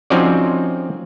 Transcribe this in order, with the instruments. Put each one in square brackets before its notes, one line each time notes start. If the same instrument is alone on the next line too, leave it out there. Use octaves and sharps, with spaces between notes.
[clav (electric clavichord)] F3 C4 C#4 D#4 F#4 D5